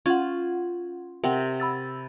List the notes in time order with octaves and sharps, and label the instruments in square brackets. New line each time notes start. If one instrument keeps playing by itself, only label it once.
[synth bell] C#4 F#5 [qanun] F4
[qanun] C3 C4 [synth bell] A#4 F#5 G5
[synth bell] B5 E6 A6